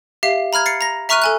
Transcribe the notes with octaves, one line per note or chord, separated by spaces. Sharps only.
G4 E5 F5 C7
A#5 B5 F6 G#6
A6 C7 C#7
A#5 A#6
E5 A#5 C#6 F6 F#6 D#7
A4 G#5 F#6